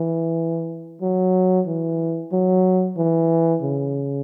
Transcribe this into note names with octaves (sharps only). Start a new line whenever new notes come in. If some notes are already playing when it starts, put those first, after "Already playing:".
Already playing: E3
F#3
E3
F#3
E3
C#3